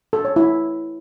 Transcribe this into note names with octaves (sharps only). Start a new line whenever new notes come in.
A4
C#5
E4